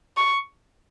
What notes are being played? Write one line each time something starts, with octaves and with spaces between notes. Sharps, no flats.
C#6